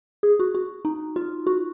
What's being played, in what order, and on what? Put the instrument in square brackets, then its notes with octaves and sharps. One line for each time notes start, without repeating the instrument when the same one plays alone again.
[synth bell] G#4
F#4
F#4
D#4
F4
F#4